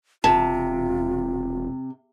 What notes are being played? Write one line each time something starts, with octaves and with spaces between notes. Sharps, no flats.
E1 C3 F4 A5